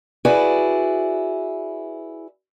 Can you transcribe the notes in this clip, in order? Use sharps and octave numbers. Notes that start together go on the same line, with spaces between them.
E4 F#4 G#4 B4 D5